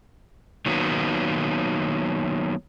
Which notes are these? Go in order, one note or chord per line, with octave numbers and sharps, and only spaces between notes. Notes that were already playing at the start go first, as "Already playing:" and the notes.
D#3 F#3 A#3 B3